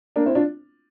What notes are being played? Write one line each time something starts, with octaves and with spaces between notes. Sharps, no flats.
A#3 D4
C4 E4
D4 F4